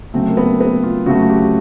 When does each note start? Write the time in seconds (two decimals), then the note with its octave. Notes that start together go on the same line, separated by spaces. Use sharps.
0.14 C#3 F#3 A3 C4
0.30 A#3
0.37 B3
0.61 B3
0.84 F4
1.06 C#3 F#3 A3 F#4
1.29 G4